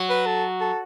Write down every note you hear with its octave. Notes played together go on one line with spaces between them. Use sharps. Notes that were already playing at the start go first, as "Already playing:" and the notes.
Already playing: F#3
B4
A4
A4